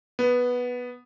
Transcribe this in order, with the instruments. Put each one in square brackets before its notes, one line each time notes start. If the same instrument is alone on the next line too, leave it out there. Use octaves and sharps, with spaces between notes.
[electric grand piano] B3